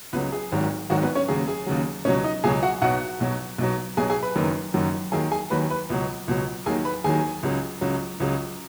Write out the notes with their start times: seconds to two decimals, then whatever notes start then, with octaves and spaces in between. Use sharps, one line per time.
0.13 C#2 C#3 F#3 B3 B4
0.32 G#4
0.52 G#1 G#2 D#3 F#3
0.90 G#1 G#2 D#3 F#3 F#4
1.02 B3 B4
1.15 C#4 C#5
1.28 D#2 C#3 F#3 G#4
1.48 G#4
1.67 D#2 C#3 F#3
2.05 C#2 B2 F#3 C#4 C#5
2.24 D#4 D#5
2.44 C#2 B2 F#3 G#4 G#5
2.63 F#4 F#5
2.82 B1 B2 F#3 F#4 F#5
3.20 B1 B2 F#3
3.58 B1 B2 F#3
3.97 B1 B2 F#3 G#4 G#5
4.10 G#4 G#5
4.23 B4 B5
4.36 F#1 F#2 D#3 F#3
4.74 F#1 F#2 D#3 F#3
5.12 D#2 D#3 F#3 G#4 G#5
5.31 G#4 G#5
5.50 D#2 D#3 F#3 B4 B5
5.70 B4 B5
5.90 C#2 B2 F#3
6.28 C#2 B2 F#3
6.66 D#2 D#3 F#3 G#4 G#5
6.85 B4 B5
7.04 D#2 D#3 F#3 G#4 G#5
7.43 C#2 C#3 F#3
7.81 C#2 C#3 F#3
8.20 C#2 C#3 F#3